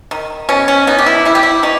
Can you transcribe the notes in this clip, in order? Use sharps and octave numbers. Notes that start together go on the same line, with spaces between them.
D#3
B2 C#4
C#4
B3 D#4
G4
E4
G3 E4
G4
E4
B2 D#4